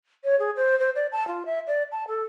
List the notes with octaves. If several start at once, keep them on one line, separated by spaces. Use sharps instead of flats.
C#5
G#4
C5
C5
D5
A5
F4
E5
D5
A5
A4